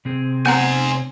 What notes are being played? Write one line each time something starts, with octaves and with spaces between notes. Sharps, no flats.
C3 C4 G#4
B3 C5 F#5 G#5 A#5